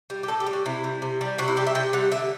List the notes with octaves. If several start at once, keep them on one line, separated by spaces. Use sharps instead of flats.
G3
G4
A2 A4
G4
G3
F#4
C3 E4
G3
C3
G3
C3 F#4
E4
G3 G4
E5
C3 G5
G3 F#5
D3 E5